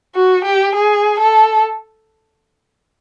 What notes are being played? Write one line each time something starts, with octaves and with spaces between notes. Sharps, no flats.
F#4
G4
G#4
A4